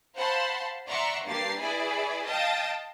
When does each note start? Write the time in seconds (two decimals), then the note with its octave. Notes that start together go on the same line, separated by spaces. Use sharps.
0.17 C5 F5 F#5 A5 B5 C6
0.89 D5 E5 F#5 A#5 C6 C#6
1.25 G2 A#3 G4 A#4 A6 C7
1.59 E4 G#4 B4 D5 G#5 B5
2.26 D#5 F5 G5 A5 D#6 A6